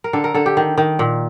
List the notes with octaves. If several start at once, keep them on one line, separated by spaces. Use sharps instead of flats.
A#4
D3 A4
A#4
D3 A4
G4
D#3
D#3
A#2